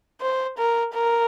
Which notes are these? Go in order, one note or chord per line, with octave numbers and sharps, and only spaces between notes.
C5
A#4
A#4